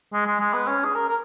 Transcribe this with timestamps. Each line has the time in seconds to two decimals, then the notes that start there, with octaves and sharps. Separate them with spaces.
0.13 G#3
0.26 G#3
0.40 G#3
0.53 B3
0.68 C#4
0.84 G#4
0.95 A#4
1.09 A#4